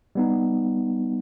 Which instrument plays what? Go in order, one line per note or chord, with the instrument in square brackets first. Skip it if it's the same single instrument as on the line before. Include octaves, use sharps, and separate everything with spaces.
[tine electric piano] G3 B3 D#4